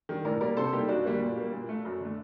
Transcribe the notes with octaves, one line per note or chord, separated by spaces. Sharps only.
D#3 G3
A2 A#4 D5
G3 A#3 A#4 D5
C3 A4 C5
G3 A#3 D#4 G4
F#2 D4 F#4
D3 G3 A#3
A#2
G3 A#3
A#2
A3
F#2
D3 A3